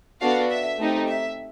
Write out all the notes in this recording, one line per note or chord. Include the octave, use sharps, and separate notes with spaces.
B3 D4 F#4 A4 F5
E5
A3 C4 D#4 G4
E5